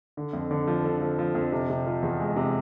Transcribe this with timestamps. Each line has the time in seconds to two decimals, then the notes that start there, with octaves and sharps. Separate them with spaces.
0.17 D3
0.33 F2
0.51 D3
0.67 F3
0.84 D3
1.01 F3
1.19 F3
1.35 F2
1.52 C3
1.70 C3
1.86 F3
2.02 E2
2.20 G#3
2.37 C3